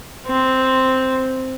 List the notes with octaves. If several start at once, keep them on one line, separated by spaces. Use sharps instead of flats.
C4